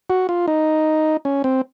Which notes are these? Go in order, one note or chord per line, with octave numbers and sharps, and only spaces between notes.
F#4
F4
D#4
C#4
C4